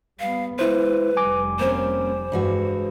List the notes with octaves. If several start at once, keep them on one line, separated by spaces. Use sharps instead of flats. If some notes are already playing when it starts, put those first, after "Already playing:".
G3 B3 F5
G#3 E4 B4 C5
F1 G3 G#5 D6
A#3 C4 C#4 C5
G2 E3 G#3 F#4